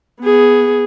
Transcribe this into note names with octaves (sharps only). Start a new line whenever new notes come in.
B3 G#4